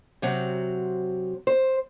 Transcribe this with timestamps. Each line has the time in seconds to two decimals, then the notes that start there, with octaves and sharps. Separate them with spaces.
0.22 C3 F#3 C4
1.47 C5